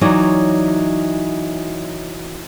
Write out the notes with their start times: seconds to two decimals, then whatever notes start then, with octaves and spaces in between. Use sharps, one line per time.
0.01 E3 F#3 D#4 C#5 D5